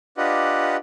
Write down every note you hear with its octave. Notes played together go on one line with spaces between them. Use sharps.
D4 F4 G4 B4 D#5 F#5